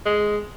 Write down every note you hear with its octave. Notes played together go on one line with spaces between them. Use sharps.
G#3